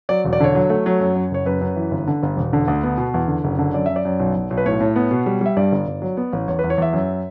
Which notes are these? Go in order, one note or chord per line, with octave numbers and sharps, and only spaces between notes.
F#3 D5
E1
D5
D3 C#5
F#3
A3
F#3
F#2
F#2
F#1 C#5
F#2 B4
F#2
E3
G1
D3
G1
E1
D3
D2
B3
B2
E2
D3
F#1
D3
F#2 D5
F#2 E5
D5
F#2
B1
B1
B1
B4
A2 C#5
A2
B3
B2
G3
G3 E5
G2 D5
G1
G1
F#3
B3
A1
E2 C#5
E2 B4
C#5
E2 E5
F#2